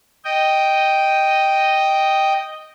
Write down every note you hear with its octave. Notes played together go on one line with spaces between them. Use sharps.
D#5 G5